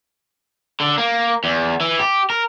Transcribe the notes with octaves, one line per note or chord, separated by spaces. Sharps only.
D3
A#3
E2
E3
G4
A#4